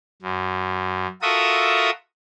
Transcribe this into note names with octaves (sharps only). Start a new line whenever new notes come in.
F#2
F4 F#4 A4 A#4 E5 D#6